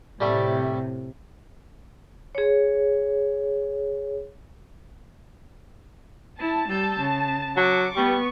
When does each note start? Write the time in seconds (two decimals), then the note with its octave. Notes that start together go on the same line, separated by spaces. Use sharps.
0.20 A2 C3 G3 A3
2.35 G#4 C#5
6.40 E4 A5
6.69 G3 E6 G6
7.00 C#3
7.57 F#3 C#6 D6
7.96 G3 B3 B4 C#6